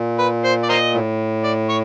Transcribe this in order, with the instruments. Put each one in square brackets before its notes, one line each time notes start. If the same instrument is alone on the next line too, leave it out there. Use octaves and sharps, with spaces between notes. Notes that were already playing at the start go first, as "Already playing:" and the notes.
Already playing: [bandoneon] A#2
[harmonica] B4
C5
D5
A#4 C5 D#5
[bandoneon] A2
[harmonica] D5
C#5